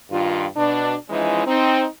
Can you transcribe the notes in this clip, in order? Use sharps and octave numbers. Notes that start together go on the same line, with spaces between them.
G2 D#3 F4
B2 D4
E3 F3 G#3 C#4 D#4 E4
C4 D#4